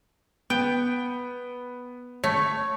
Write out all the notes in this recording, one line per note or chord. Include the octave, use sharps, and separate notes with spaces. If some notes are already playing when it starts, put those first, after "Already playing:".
B3 G5
A3 C#5